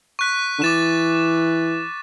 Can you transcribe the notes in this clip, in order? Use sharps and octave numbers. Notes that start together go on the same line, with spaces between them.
C#6 F#6 B6
D3
E3 D6 A6 E7